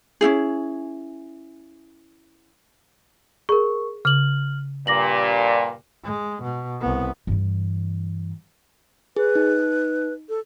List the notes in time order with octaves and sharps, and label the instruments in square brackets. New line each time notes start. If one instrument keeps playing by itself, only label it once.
[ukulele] C#4 D4 E4 G#4
[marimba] G#4 [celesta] A#4 C#6
[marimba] C#3 [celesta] F6 F#7
[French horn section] G2 A#2 [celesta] D6 A#6 F#7
[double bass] G#3
B2
C2 B3
[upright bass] G2 E3
[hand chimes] G#4 [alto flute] B4
[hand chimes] D#4
[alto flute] A4